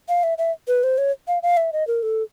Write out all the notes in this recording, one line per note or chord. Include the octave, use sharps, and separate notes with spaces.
F5
E5
E5
B4
C5
C#5
F5
F5
E5
D#5
A#4
A4